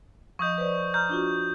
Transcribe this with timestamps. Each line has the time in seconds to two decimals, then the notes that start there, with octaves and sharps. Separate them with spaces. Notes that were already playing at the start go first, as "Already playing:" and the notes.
0.39 F3 D#5 C#6 D#6 G6
0.58 B4 C5 D5
0.94 A#5 F6 G6
1.09 D4 F4 F#4